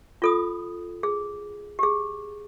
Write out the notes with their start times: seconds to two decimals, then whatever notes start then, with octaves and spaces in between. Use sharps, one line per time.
0.22 F4 A4 D#6
1.03 G#4
1.79 G4 G#4